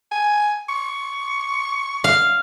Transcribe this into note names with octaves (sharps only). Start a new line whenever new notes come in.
G#5
C#6
F5